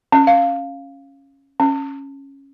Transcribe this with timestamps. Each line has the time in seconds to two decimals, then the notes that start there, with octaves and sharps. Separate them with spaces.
0.12 C#4
0.27 F5
1.60 C#4